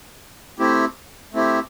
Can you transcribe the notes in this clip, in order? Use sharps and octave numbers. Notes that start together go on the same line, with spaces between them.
A3 C4 E4 G4
A3 C4 E4 G4